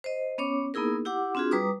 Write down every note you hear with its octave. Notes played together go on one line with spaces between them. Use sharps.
C5 D#5
B3 C#4 C#5 D6
A#3 B3 D#4 E4 G#4 A#4
E4 G4 F#5 D6
C4 D4 F4 F#4 G#4
G3 B4 A#5 D6 D#6